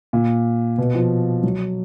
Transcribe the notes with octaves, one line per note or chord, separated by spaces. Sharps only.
A#2
B2
F3
F#3